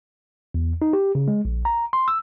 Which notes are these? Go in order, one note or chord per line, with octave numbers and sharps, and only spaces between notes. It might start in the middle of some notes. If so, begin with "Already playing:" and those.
E2
D#4
G4
C#3
G#3
A#1
A#5
C6
E6